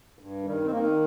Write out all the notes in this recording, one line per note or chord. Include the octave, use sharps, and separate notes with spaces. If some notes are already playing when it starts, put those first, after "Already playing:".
G2
D#3 G3
C4
D#3 A#3